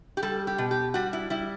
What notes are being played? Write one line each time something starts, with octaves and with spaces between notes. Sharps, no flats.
G4
G3 A4
G4
B2
G4
G3 F#4
E4
G3 E4